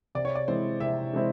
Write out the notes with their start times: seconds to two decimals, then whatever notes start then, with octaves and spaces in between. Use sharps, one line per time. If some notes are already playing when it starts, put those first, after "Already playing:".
0.15 C3 D5
0.25 C#5
0.35 D5
0.48 E3 G#3 C4 E4 C5
0.80 C3 E5
1.13 E3 G#3 C4 E4